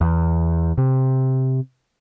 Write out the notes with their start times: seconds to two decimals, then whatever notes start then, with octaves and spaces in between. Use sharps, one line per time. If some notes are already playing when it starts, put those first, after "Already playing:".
0.01 E2
0.78 C3